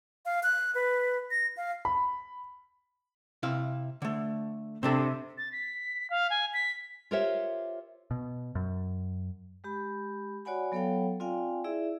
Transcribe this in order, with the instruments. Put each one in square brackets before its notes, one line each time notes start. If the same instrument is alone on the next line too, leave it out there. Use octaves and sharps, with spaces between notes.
[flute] F5
F#6
B4
A#6
F5
[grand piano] B5
[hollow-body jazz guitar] C3 E4 F5
D3 A3
[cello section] C3 [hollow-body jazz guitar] C4 D4 A4
[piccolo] A6
B6
F5
G#5
B6
[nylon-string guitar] F4 G4 A#4 C5 C#5 E5
[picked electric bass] B2
F#2
[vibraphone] G#3 G4 B5
F#4 C#5 D5 F#5 G#5 B5
F#3 B3 A4 C#5 F5 G5
C4 F4 D5 F5 G5 G#5
E4 G#4 D5 E5